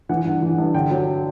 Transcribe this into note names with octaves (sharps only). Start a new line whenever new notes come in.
E3 F#5
G2
E3
G2
D3 G5
F#3